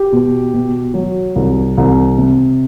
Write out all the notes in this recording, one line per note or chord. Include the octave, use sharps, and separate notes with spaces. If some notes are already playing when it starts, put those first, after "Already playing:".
Already playing: G4
B2
B2
F#3
C2
C2
C3